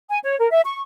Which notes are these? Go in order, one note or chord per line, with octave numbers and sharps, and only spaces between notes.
G#5
C#5
A#4
E5
C#6